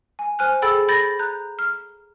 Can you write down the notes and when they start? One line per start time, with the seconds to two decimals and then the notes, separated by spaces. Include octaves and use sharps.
0.19 G#5
0.39 C5 G#5 F6 F#6
0.62 G#4 A4 G5 B5 E6 A6
0.88 B5 G6 A6 A#6
1.19 A#5 F#6 G6
1.59 F6